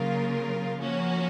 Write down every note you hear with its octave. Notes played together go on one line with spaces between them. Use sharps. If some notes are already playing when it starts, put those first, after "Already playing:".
Already playing: C#3 F#3 A#3 F4 A#4
F3 A#3 C#4 F#4